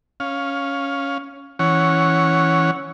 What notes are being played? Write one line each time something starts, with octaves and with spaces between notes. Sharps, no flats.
C#4 F5
E3 C#4 C#5 F#5